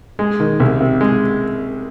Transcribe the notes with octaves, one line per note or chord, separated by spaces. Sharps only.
G#3
D#3
C2
C3
G#3